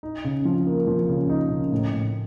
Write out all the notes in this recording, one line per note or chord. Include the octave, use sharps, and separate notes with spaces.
D#4
C#3
F3
A#3
F3
C#3
D#4
C#3
A2
A2